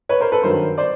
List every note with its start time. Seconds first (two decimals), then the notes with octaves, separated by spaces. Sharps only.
0.09 B4 C#5
0.20 A#4 C5
0.32 A4 B4
0.43 G2 D#3 F#3 A#4 C5
0.78 C5 D5